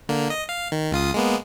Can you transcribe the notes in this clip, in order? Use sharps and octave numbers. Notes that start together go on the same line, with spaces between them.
D3 A#3
D#5
F5
D#3
C#2 F4 D#6
G#3 A#3 B3